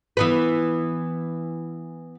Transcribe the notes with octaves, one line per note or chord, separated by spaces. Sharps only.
E3 B3 B4